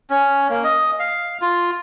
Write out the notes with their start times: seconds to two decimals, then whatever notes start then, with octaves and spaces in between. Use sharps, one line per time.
0.10 C#4
0.50 A#3
0.64 D#5
1.00 F5
1.42 F4